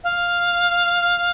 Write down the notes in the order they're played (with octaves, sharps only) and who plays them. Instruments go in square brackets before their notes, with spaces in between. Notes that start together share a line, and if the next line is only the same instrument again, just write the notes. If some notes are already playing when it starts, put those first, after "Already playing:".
[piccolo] F5